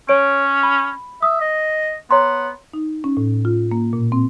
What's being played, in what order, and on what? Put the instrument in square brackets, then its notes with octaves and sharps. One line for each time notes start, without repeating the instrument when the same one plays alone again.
[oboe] C#4 [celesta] C#5 D7
[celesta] B5
[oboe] E5 [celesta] D#6
[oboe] D#5
[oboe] B3 [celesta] C#5 A#5 C6
[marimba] D#4
C#4
A2
F4
A#3
A#2
C4